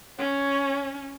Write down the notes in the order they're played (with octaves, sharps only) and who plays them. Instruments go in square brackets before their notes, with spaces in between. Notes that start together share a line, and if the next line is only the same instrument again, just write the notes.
[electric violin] C#4 [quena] C#5